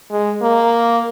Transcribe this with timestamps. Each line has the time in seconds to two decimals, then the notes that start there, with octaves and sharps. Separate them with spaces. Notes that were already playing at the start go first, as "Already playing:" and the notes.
0.11 G#3
0.42 A#3